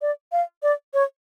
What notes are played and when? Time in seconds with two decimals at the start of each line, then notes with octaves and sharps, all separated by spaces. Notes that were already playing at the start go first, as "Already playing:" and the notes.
0.02 D5
0.32 F5
0.63 D5
0.94 C#5